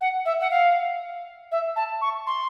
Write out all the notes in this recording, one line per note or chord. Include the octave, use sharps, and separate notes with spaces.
F#5
E5
F#5
F5
E5
A5
C#6
C6